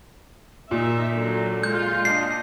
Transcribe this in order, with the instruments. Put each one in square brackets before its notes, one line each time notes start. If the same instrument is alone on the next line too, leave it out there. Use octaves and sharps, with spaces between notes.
[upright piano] A#2 [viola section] D#3 D#4 E5
[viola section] D3 F#3
[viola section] G#3 F4 [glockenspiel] G6
[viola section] D4 D#5 [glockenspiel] C7